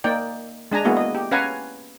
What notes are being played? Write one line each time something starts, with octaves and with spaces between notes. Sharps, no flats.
A#3 D#4 D5 G5
G#3 D4 G#5 A#5
G#3 A#3 B3 E4 F#4 G#4
D#5
G4
C#4 B4 F5 F#5 G#5 A#5